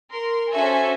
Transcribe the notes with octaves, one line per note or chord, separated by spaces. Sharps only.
A#4 C6
C#4 F#4 A4 C5 E5 G#5